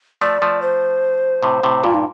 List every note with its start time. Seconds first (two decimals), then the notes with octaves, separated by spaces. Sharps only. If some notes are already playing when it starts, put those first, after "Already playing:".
0.21 F3 A3 D5
0.42 F3 A3
0.62 C5
1.43 A2 C3
1.63 A2 C3
1.83 G2 A#2 F4
1.94 D#4